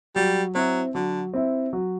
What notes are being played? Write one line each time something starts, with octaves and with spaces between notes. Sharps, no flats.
F#3 G3
F#3 C4 E4
D3 F#3
C4 E4
F#3